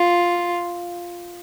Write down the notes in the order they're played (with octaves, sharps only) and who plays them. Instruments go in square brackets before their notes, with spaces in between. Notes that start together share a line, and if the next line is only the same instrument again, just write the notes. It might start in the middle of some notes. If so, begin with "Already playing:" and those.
Already playing: [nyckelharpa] F4